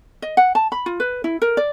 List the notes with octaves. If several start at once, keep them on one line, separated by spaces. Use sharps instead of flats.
D#5
F#5
A5
B5
F4
B4
E4
A#4
D5